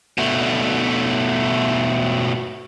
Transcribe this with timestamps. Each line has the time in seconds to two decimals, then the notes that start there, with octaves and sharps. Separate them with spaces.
0.18 B2 A3